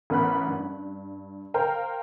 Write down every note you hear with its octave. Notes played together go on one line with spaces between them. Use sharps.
A1 B3 A#4 F#5 B5 F#6
G2
A#4 C5 F5 G5 A#5